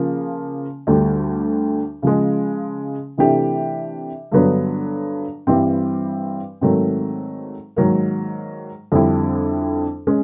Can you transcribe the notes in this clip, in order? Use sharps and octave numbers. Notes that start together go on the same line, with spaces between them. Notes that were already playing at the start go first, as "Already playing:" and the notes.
Already playing: C#3 F3 A#3
D2 D3 G3
C#3 F3 G#3
C3 E3 A3 D4 G4
G2 D3 F#3 B3 D4
G2 E3 G3 C4
G#2 D#3 F#3 A3 C4
G#2 D#3 F#3 A#3
F2 D3 G3 C4 E4
G#3 C#4